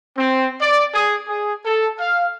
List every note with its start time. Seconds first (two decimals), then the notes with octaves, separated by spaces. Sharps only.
0.17 C4
0.60 D5
0.94 G#4
1.27 G#4
1.65 A4
1.99 F5